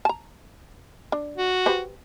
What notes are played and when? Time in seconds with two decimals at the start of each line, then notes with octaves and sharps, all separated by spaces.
0.05 A5 A#5
1.12 D4
1.37 F#4
1.66 G4 B4 C5